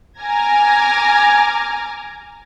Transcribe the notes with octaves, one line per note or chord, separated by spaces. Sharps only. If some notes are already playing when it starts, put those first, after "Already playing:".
G#5 A#5 D6 F6 G#6 A#6